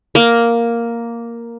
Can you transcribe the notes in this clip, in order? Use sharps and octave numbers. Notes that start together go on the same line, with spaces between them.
A#3